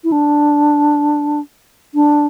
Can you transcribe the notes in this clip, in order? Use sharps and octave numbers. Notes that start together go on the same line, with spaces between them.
E4
D4
D4